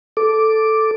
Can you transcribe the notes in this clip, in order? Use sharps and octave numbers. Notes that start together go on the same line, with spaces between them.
A4 D6